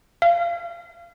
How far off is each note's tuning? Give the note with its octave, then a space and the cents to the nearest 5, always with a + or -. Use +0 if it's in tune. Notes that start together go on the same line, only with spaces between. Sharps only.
F5 -25